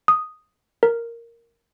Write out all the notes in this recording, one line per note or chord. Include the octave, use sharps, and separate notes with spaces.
D#6
A#4